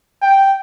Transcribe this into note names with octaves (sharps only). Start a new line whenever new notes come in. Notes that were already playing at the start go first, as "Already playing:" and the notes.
G5